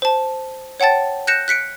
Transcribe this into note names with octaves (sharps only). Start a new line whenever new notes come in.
C5 A5
C#5 F#5 G5 A5 A6
F#6 G6 A#6 C#7 E7
F#6 B6 C#7 D7